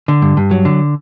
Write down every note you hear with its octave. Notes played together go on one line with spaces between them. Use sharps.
D3
G2
G2
F#3
D3